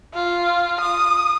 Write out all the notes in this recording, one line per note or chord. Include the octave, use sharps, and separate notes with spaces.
F4
D#6